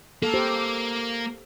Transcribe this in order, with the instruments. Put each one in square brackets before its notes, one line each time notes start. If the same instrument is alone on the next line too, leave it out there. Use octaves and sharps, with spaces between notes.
[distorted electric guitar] A#3 [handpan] A4
[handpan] G4 C5